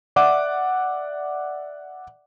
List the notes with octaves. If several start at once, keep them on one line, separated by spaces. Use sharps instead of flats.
D5 E5 F#5 D6